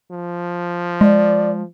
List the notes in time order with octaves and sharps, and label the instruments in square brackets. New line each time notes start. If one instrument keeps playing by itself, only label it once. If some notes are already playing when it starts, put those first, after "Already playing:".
[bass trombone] F3
[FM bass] G#3 [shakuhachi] D5